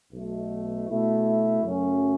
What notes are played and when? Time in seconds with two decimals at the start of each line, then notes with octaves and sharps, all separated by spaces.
0.12 B1 B2 A3
0.87 B2 A3 E4
1.63 F#2 C#3 F#3 A3 C#4